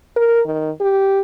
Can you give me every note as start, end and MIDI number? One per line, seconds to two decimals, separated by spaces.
0.17 0.41 70
0.47 0.70 51
0.81 1.21 67